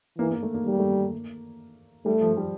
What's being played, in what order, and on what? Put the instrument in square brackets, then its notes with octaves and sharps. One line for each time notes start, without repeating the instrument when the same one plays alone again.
[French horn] E3 [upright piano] A#3
[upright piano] A#3
A3
A#3
[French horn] G3 [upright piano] A#3
[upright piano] A3
A#3
[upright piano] G3 [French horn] A3
[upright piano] F3
G3